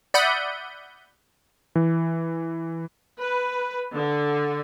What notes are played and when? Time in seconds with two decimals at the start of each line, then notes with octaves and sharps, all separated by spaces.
0.14 D5 E5 F#5 B5 D#6 G6
1.75 E3
3.20 B4
3.94 D3